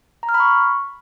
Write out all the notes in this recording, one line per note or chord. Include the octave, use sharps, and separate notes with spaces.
A#5
F6
B5
C#6